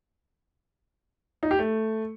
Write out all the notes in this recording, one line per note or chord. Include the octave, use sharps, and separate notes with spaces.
D#4
G4
A3